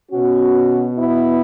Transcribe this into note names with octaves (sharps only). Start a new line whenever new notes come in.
B2 B3 C#4 F#4
B3 E4